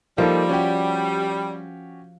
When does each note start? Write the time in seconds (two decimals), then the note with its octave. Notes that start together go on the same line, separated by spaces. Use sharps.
0.18 F3 G3 A#3 D#4 A4
0.49 C#4 F#4 G4